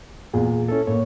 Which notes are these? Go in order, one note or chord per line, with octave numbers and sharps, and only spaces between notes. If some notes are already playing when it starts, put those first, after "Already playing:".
E2 A#2 G#4
C#4 E4 A4
A2 A#3 C#5